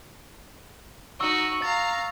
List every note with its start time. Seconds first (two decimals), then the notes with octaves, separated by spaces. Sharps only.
1.20 D#4 F#4 C#6 E6
1.62 F5 A#5 A6